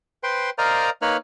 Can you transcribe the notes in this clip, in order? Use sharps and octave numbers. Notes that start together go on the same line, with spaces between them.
B4 C5 G5 C6
A#4 C5 D5 D#5 F5 A#5
A#3 D#4 B4 C#5 B5 F6